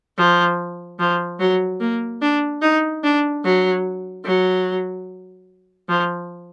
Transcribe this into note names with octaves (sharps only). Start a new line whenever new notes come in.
F3
F3
F#3
A#3
D4
D#4
D4
F#3
F#3
F3